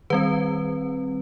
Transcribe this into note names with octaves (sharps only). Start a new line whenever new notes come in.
D#3 G3 C4 B4